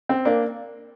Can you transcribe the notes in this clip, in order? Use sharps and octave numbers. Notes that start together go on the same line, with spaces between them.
C4
A#3 D4